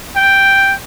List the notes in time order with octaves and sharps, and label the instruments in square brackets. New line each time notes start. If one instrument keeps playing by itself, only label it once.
[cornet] G5